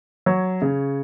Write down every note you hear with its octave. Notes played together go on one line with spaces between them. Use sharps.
F#3 C#5
C#3